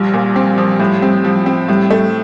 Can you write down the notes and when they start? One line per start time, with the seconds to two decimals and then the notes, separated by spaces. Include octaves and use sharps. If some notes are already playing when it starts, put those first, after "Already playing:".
Already playing: A#1 G3
0.13 A#2
0.36 C4
0.58 F3
0.79 A2
1.02 C4
1.24 F3
1.46 C4
1.69 A2 G3
1.90 A3